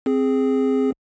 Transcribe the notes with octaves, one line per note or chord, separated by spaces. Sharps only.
C4 G#4